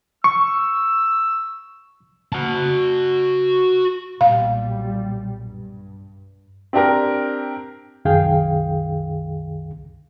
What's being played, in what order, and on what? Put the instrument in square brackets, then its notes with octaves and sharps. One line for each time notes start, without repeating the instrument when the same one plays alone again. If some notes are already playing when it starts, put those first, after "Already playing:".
[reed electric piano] C#6 [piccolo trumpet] E6
[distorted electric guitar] F#4 A5
[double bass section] B1 A#2 G3 [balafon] F5
[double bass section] G2
[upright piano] C4 D4 G4 A#4
[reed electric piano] C2 F#2 D#3 G#4 F5 G5